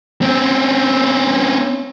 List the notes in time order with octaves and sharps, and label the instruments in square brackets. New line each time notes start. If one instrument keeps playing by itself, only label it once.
[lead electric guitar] C4 C#4